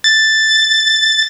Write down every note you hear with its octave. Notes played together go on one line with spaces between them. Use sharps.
A6